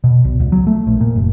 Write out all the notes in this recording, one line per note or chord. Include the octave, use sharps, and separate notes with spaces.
B2
B1
C#2
F#3
A3
A#1
A#2
F#1